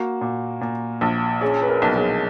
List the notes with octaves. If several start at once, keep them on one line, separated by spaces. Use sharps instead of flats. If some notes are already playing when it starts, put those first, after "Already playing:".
Already playing: A#3 F#4
A#2
A#2
A#1
C#4 G#4
B4
A#4
B1
G#4